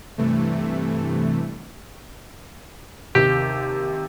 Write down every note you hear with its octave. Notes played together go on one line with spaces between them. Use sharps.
G2 C3 E3 A3
D#2 C3 G4